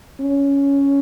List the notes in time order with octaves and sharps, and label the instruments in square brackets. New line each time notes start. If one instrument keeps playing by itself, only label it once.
[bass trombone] C#4